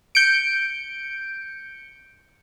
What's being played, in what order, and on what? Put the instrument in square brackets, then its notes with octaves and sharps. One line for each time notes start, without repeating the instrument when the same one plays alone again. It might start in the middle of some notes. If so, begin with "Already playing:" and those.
[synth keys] G6 C#7 D7